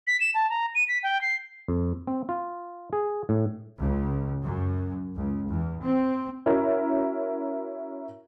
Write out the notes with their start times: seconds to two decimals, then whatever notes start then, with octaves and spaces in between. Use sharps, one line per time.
0.07 B6
0.20 E7
0.35 A5
0.49 A#5
0.75 D#7
0.88 B6
1.03 G5
1.21 C7
1.68 F2
2.07 C4
2.29 F4
2.93 G#4
3.29 A2
3.79 C#2
4.43 F#2
5.15 C#2
5.49 E2
5.81 C4
6.46 C#4 E4 F#4 A#4